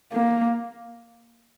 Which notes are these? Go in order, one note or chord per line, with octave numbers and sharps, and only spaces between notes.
A#3